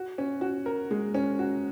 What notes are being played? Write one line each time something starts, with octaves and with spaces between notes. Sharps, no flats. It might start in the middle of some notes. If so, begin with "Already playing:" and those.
Already playing: F#4
C#4
F#4
A#4
G#3
C#4
F#4